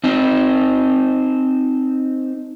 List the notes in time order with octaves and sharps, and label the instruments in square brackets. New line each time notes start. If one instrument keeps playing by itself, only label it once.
[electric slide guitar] C4 D#4